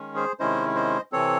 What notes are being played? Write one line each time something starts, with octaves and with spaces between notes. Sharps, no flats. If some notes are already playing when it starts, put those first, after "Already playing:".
Already playing: D#3 G#3 C#4
G#4 C5
C3 D#3 G#3 C#4 E4 C5 D#5
C5 D#5
C3 E3 C4 A4 C#5